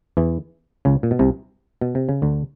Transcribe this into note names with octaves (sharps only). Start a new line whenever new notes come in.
E2 E3
C#2 C#3
A#2
B2
C2 C3
B2
C3
C#3
D2 D3